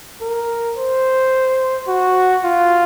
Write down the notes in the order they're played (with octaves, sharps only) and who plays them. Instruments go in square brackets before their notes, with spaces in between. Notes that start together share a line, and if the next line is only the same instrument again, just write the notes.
[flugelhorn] A#4
C5
F#4
F4